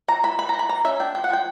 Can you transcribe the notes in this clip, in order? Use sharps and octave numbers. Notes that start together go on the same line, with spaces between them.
E3 A#5
E3 B5
E3 B5
A#5
E3
B5
E3 A#5
C#4 E5
D4 G5
F3 G5
F#5
F3 G5